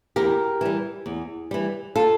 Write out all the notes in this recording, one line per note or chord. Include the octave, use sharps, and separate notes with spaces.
E2 G4 A#4
E3 G3
E2
E3 G3
F4 A4